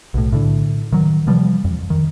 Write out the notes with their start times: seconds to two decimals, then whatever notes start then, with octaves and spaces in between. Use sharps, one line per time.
0.14 B1 A2
0.32 A2 D3
0.92 D#3 F#3
1.27 C3 E3 F3 G3
1.64 F2
1.90 D#3